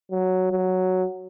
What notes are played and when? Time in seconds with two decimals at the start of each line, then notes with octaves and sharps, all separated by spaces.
0.11 F#3
0.52 F#3